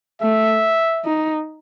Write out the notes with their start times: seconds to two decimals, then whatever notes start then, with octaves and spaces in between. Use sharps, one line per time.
0.21 A3 E5
1.05 D#4